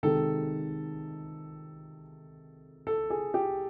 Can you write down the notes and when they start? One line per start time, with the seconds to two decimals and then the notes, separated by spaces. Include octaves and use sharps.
0.03 C3 D#3 G#3 A4
2.87 A4
3.10 G#4
3.34 G4